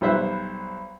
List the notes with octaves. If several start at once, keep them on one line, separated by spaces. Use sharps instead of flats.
B1 G3 B4 C5 E5 F#6